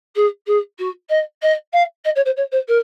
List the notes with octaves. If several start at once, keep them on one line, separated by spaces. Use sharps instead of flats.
G#4
G#4
F#4
D#5
D#5
F5
D#5
C#5
C5
C#5
C5
A#4